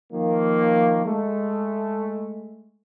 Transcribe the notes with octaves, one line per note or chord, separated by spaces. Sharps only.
D#3 F3 A#3
G#3 A3